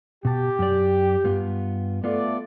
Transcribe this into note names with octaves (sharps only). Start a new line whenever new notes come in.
B2 G4 A5
F#2 D5
G2 B3 F4
A3 B3 F4 D5